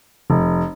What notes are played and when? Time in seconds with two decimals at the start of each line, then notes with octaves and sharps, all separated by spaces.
0.30 F1